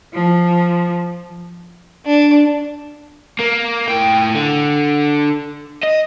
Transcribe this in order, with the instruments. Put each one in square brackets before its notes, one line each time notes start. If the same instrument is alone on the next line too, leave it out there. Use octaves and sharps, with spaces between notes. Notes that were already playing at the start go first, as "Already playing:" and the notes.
[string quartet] F3
[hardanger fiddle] D4
[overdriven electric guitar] A#3
A2 G5
D3
D#5